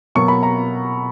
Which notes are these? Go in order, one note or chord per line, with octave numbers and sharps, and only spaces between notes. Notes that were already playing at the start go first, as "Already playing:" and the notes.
B2 F#3 A#3 C#6
B5
A#5